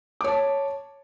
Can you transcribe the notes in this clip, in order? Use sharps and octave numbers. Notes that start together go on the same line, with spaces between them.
C#5 A5 D6